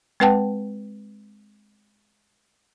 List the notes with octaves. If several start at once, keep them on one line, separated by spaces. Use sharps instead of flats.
G#3 C4 B4 F#5 G5 A5